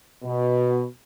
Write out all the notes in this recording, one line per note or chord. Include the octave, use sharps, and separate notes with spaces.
B2